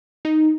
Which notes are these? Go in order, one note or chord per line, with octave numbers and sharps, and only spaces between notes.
D#4